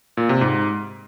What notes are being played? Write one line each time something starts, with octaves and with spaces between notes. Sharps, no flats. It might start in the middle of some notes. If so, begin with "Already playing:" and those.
A#2
C3
G#2